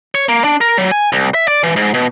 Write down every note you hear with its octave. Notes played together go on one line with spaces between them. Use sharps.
C#5
A#3
D4
A#4
F#3
G#5
C2
E5
D5
E3
G#2
B2